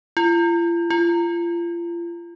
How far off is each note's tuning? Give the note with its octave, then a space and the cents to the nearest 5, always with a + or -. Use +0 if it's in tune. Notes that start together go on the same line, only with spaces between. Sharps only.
F4 -45
F4 -35